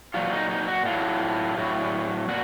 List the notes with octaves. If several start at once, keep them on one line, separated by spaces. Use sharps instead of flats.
A#2 F#3 F4
D#4
D#4
F#4
A2 F#3 F4
A2 F#3
A#2 F#4